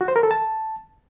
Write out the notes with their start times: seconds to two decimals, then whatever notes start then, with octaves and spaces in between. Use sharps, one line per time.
0.01 F#4
0.08 C5
0.16 A#4
0.23 A4
0.31 A5